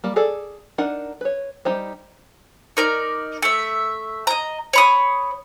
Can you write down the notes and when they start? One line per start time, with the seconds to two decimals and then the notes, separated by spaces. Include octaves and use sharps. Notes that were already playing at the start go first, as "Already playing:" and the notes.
0.04 G3 A#3
0.16 G#4 A4 D5
0.78 D4 D#4 A#4 F#5
1.21 B4 C#5
1.65 G3 D#4 G4 C5
2.77 D#4 A#4 D5
3.42 A3 E5
4.27 D#5 A#5
4.73 C#5 B5 D#6